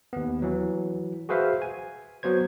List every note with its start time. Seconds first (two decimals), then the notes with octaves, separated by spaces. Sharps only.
0.13 D#2 B3
0.42 E3 F#3
1.29 F#4 G#4 B4 C5 E5 F5
1.62 G#5
2.23 F#3 B3 F#4 C5 G#6